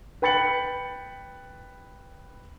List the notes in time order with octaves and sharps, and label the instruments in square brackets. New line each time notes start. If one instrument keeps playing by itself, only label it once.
[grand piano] B4 G5 B5 A6 C#7 F#7